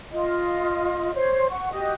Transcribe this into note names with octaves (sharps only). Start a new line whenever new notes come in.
F4 D#5
C5 C#5
F#5 C#6
F#4 G4 D#5